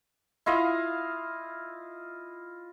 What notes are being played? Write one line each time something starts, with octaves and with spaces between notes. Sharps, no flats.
E4 F4 D#5 F5